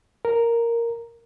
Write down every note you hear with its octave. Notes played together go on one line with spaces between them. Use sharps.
A#4